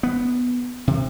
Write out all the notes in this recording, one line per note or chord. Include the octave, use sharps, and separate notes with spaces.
B3
C3